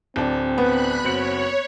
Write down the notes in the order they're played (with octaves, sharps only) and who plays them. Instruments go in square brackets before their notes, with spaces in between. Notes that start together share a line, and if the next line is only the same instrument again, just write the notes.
[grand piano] D1 D4 [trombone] C4
[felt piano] B3 [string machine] B5 F#6
[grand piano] F#1 C4 C#7 [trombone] F#4 [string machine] C#5